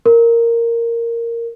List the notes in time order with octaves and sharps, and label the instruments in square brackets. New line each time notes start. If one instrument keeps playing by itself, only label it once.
[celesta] A#4